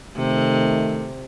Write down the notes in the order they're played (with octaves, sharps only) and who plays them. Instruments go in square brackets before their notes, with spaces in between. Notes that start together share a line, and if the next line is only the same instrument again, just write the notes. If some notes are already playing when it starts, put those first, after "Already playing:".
[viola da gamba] C3 [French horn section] D#3 A3